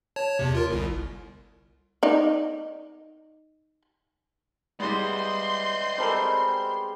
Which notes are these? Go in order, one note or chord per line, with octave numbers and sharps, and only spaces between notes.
C#5 A5
E2 C3
F4 A#4
G1 C2
D#4 D5
G3 G#3 B3 D5 D#5 C6 G6
G3 G#3 C4 A4 A#4